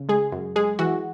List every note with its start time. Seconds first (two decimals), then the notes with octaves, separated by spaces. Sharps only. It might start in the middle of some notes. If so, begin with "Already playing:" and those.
Already playing: C#3
0.09 G#3 G#4
0.32 F#2
0.56 G#3 G#4
0.79 E3 F#4